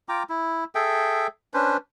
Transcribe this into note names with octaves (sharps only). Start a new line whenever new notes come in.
F4 G5 A#5 D6
E4
G#4 A4 E5 G5
C#4 D4 B4 C5